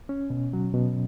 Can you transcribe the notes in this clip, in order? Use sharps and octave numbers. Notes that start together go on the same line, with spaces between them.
C#4
B2
F#3
B2